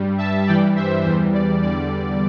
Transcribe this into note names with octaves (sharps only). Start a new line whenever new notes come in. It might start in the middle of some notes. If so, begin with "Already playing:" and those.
Already playing: G2 G3
E5 A5
G2 E3 G3 D5 G5
C5 E5
E2 E3 G3 C5
D5
E2 D3 G3 D5